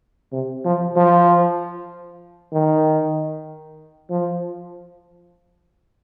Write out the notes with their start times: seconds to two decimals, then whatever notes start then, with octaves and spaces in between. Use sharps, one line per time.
0.33 C3
0.65 F3
0.96 F3
2.53 D#3
4.10 F3